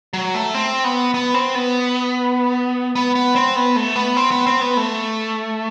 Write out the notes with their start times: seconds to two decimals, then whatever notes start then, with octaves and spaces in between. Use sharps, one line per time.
0.13 F#3
0.34 A3
0.54 C4
0.84 B3
1.14 B3
1.34 C4
1.55 B3
2.95 B3
3.15 B3
3.36 C4
3.56 B3
3.76 A3
3.96 B3
4.17 C4
4.31 B3
4.46 C4
4.61 B3
4.77 A3